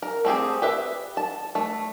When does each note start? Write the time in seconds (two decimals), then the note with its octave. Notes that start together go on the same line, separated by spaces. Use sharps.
0.02 A#4
0.25 A3 C4 G4 G#4
0.62 G4 B4 E5
1.17 A5
1.55 A3